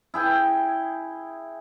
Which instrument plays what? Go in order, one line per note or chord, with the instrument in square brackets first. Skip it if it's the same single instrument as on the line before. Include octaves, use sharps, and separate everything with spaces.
[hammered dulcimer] E4 G#4 G5